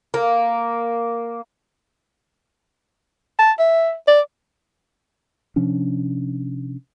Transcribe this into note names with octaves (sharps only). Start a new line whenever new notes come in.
A#3
A5
E5
D5
C3 F3 C#4 D4